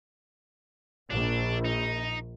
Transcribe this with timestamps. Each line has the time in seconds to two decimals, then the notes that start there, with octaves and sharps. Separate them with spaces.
1.10 A#1 D4
1.65 D#4